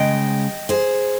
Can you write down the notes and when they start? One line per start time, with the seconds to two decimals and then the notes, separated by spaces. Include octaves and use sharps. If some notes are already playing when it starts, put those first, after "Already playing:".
Already playing: C#3 G#3 D#5 G5
0.69 G#4 C5